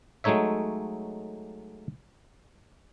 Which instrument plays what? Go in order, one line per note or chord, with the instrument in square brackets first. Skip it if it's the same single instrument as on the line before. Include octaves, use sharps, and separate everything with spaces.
[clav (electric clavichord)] F#3 G#3 A3 D#4 C#5 E5